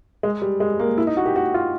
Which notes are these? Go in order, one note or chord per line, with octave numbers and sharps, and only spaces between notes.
G#3
G3
G#3
A#3
E4
D#4
F#4
G4
F#4
F4